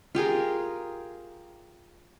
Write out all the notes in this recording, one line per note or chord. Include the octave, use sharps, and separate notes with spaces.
F4 G4 G#4 A#4